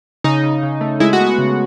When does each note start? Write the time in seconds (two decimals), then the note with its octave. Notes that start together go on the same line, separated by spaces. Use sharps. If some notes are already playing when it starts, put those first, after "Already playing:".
0.24 C#3 D#4
0.44 C#3
0.63 C#3
0.81 A3
1.00 G#3 E4
1.13 F#4
1.20 B3
1.27 F#4
1.39 C#3